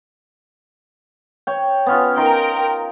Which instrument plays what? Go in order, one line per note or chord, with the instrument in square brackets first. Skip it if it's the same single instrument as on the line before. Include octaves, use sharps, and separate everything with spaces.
[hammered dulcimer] C#5 G5
B3 C#4 F4
[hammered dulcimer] D#4 C6 [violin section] A#4 G5